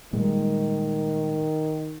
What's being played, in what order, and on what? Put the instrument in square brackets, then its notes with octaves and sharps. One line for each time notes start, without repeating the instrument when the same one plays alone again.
[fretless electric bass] A#2 G3 G#3 [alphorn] D#3